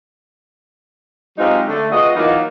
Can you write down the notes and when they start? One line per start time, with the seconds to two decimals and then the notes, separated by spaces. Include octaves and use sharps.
1.38 F#3 G#3 C4 D#4 F4 G4
1.68 D3 A3
1.91 G#3 B3 F4 F#4 D#5
2.16 E3 F#3 A#3 D#4 F4